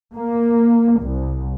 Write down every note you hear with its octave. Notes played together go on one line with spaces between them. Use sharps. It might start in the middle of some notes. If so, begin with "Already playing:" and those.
A#3
C2